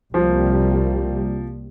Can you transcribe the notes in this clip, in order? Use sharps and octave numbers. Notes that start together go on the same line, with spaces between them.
C2 C3 F3 G3 A#3